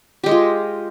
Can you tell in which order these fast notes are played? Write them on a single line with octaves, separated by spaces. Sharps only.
G4 G#3 G#4 F4